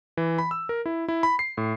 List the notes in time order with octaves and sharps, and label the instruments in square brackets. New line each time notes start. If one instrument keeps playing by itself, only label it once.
[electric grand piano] E3
B5
E6
A#4
E4
E4
B5
C7
A2